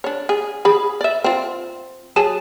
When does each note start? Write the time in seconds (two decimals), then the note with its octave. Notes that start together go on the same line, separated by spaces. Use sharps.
0.04 D4 C#5
0.29 G#4
0.65 G#4 B5
1.01 D5 E5
1.24 C4 F4
2.16 F#3 G#4 A5